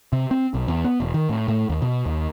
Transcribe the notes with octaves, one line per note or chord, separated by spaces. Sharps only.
C3
C4
B1
E2
B3
E1
D#3
A2
A2
D#2
B2
D#2